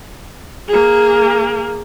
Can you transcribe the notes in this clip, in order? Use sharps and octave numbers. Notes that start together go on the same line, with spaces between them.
A#3 G#4